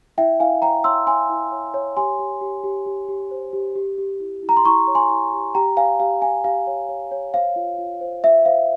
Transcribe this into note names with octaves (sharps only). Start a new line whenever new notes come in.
E4 E5 G5
E4 F5 G#5
C#5 G5 A#5
C#5 C6 E6
C#5 G#5 C6
E4
C#5
C#5
G4 G#5 C6
G4
G4
G4
G4
G4
C5
G4
G4
G4
E4
E4
A#5
C6
E4 A#5 C#6
C#5
G#5 C6
E4
G4
G4 G5 A#5
C#5 F5 G#5
G4 F5
G4 F5 G#5
G4 F5
C#5
C#5
C#5
C5 F5
F4
F4
C5
F4 E5
C5 F5